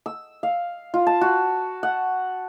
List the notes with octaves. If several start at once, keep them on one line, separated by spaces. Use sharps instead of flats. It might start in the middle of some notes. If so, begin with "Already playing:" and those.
E6
F5
F4
A5
F#4
F#5